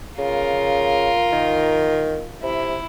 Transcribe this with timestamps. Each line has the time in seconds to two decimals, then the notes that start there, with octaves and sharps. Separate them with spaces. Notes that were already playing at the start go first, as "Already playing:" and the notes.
0.18 C#3 F4 A#4
1.33 D#3
2.43 C3 E4